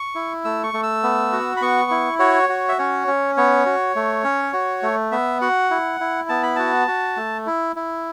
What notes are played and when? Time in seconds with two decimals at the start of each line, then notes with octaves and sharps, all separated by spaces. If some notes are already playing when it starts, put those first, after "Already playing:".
Already playing: C#6
0.15 E4
0.44 A3 E6
0.63 C#6
0.74 A3
0.83 E6
1.03 B3
1.32 F#4
1.57 B5
1.61 B3 C#6
1.91 E4
2.19 F#4 C#5
2.49 F#4
2.69 E5
2.79 C#4 C#5
3.07 C#4
3.37 B3 C#5
3.66 F#4
3.96 A3
4.24 C#4
4.53 F#4
4.83 A3
5.12 B3 E5
5.41 F#4 F#5
5.71 E4
6.00 E4
6.29 B3 A5
6.43 B5
6.56 F#4 A5
6.88 F#4
7.17 A3
7.46 E4
7.76 E4